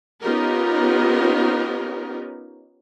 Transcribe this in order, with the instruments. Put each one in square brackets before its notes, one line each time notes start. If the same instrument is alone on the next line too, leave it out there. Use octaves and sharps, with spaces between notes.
[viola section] B3 C#4 D#4 F4 G4 A#4